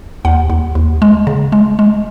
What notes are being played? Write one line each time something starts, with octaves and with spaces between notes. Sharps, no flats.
D#2 F#5
D#2
D#2
G#3
C#3
G#3
G#3